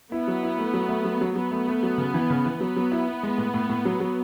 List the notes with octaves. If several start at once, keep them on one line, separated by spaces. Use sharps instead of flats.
B3 E4
F#3
E4
A3
F#3
A3
F#3
F#3
F#3 B3
A3
A3
F#3
C#3
E3
C#3
E3
F#3 B3
F#3
E4
E4
G#3
A2
A2
A2
F#3
F#3